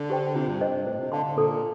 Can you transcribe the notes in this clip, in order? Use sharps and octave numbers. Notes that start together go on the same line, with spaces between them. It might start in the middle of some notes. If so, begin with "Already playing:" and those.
Already playing: D3
G4 C5 G5
C3 F4
G2
C5 D#5
G2
A2 C5
C3
D3 F5 A5 C6
D3
A#2 A4